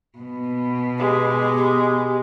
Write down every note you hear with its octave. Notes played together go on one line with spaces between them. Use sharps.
B2 B3
G#3 G4